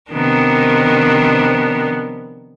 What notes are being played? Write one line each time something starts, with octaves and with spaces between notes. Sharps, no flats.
C3 D#3 F3 B3 D4 A#4